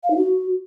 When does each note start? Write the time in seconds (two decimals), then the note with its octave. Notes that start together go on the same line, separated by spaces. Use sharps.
0.03 F5
0.10 D#4
0.17 F#4